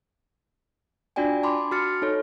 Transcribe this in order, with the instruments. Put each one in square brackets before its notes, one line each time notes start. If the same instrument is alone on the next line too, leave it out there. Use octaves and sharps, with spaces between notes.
[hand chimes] D4 F4 F#4 D5 G5 G#5
A5 B5 C6 D6
F#4 C6 F6 A6 C#7
D#4 A4 C#5